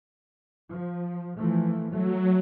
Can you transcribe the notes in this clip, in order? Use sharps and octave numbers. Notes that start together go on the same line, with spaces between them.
F3
E3 F3 A3
F#3 A3